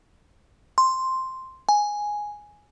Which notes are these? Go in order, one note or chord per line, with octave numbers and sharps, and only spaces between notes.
C6
G#5